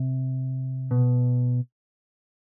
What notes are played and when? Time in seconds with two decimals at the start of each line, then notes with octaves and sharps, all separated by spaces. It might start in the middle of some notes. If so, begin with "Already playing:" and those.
Already playing: C3
0.91 B2